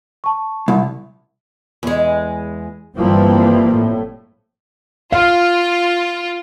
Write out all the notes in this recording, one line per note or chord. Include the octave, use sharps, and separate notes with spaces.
A5 C#6
C2
E2 G#3
G1 E3 F3 G3 A#3 C4
A2
F4 F5